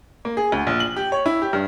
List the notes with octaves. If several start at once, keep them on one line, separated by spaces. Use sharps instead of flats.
A#3
G#4
D2
A#1
F#7
G4
C#5
E4
G4
G2